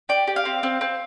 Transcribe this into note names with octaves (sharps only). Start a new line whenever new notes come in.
G4 D5
G4
F5
C4
C4
C4